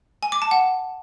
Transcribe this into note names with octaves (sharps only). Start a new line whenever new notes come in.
G#5
D6
A5
F#5